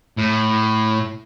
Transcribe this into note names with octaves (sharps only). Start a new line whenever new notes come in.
A2